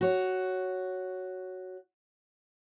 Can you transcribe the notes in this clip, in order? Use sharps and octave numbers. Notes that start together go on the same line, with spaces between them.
F#4 C#5